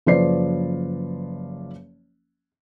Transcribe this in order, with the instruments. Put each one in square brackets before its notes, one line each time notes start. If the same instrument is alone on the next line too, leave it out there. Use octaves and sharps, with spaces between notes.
[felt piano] F#1 F3 B4 C5 D5 C7